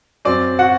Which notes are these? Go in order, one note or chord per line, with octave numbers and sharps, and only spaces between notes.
F#2 F#3 C4 D5
F#4 F#5